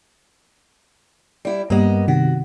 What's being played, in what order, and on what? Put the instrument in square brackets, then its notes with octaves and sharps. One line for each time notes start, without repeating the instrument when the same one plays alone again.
[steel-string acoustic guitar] G3 E4
[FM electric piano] G2 G3 [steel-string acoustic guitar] A#3 B3 D#5
[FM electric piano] C3 D#3 [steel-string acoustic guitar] F#4